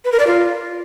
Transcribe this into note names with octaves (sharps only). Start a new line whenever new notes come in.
B4
A#4
D5
F4